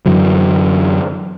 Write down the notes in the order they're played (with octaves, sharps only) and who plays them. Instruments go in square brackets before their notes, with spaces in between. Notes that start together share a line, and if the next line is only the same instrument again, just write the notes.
[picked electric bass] F#2 D3 E3 F#3